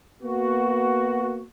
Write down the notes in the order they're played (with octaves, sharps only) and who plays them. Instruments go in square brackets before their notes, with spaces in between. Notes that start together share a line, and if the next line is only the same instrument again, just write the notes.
[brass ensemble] A#3 B3 F#4